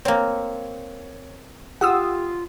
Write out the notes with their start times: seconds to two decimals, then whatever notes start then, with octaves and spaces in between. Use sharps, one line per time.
0.05 A#3 C4 C#5
1.81 F4 G4 F#5 D#6 E6